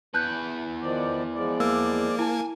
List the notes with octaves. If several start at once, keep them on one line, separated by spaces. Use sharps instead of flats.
E2 B4 A5 F#6 G6
D#3 F3 D5
F3 G#3 D5
A#3 E6
E4 G#5 A5